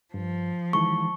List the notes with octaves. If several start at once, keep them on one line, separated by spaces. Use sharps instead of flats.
G2 F3
D#3 E3 G#3 A5 C#6